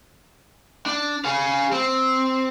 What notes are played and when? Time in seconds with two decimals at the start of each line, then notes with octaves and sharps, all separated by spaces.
0.86 D4
1.25 G#4 F5
1.72 C4